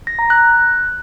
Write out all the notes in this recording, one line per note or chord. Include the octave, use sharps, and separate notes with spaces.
A#6
A#5
F#6